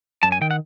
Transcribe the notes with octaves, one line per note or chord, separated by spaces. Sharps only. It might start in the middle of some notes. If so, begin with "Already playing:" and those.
F#2 A5
G#5
D#3 G5
F#5